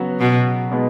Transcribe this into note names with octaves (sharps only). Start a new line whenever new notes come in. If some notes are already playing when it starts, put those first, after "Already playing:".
Already playing: C#3 F#3 B3 F#4
B2
B2 G#3 B3 D#4